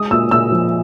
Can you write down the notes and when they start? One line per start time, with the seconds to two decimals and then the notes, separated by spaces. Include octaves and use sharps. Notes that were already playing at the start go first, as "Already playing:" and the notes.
Already playing: G#3 D#6
0.11 A#2 E6
0.31 A#2 E6
0.52 F3